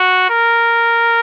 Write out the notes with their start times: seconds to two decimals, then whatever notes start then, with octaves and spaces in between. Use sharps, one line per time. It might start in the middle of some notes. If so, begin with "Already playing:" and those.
Already playing: F#4
0.29 A#4